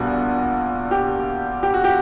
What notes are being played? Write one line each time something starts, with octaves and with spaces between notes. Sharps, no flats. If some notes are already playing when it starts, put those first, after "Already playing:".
Already playing: A#1 A#2 G3 B3 F#4
G4
G4
F#4
G4